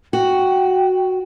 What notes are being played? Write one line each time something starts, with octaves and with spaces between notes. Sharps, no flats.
F#4 G5